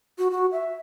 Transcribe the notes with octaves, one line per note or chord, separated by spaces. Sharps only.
F#4
F#4
E5